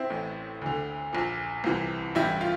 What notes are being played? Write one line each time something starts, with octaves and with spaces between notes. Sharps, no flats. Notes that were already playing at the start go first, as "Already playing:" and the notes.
Already playing: C4 E4
A1 A2 E3
D2 D3
A#1 A#2
C2 C3 E3
A1 G2 E3 E4 G4
F4